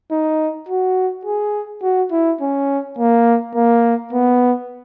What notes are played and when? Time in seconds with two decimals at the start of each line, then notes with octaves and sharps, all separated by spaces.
0.11 D#4
0.68 F#4
1.25 G#4
1.82 F#4
2.11 E4
2.41 C#4
2.98 A#3
3.55 A#3
4.13 B3